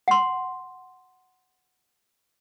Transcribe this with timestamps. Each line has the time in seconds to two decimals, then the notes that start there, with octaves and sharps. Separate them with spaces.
0.08 F#5 C6